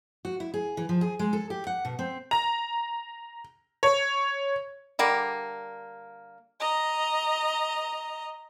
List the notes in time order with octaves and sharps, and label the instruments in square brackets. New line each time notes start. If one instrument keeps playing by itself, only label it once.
[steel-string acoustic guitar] F#4
E4
G#4
E3
F3
G#4
G#3
A4
G4
F#5
B2
C4
[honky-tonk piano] A#5
C#5
[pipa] D3 G3 A#3
[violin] D#5 A#5